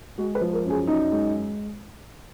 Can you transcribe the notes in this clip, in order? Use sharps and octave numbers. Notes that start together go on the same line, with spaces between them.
G#3 F#4
B4
F3
A#4
F#2
G#4
F#2 D#4
G#3